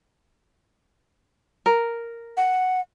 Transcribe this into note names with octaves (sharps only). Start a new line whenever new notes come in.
A#4
F#5